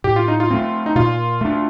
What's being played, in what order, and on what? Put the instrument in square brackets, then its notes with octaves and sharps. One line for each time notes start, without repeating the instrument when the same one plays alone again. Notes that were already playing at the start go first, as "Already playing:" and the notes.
[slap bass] A2 [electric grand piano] G4
[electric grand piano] F4
D#4
F4
[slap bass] A3 C4
[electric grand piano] D#4
[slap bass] A#2 [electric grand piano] F4
[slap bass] A3 D4